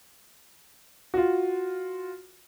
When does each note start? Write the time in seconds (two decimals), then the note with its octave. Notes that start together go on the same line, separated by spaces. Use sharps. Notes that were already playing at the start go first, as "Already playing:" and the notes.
1.14 F4 F#4